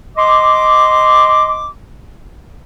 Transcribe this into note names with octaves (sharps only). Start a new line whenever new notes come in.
D#5 C6 D6